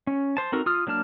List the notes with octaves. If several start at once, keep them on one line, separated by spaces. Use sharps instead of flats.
C#4
C5 A5
C4 D#4 F#4 A4 A#4
F4 D#6 F6
F#3 A#3 D4 A5 F6